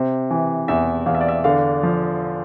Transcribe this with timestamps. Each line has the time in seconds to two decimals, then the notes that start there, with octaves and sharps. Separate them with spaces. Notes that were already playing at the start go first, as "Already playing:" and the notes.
Already playing: C3 C5
0.31 E3
0.68 E2 E5
1.06 E2 F5
1.15 E5
1.21 D5
1.28 E5
1.44 D3 F5
1.83 F3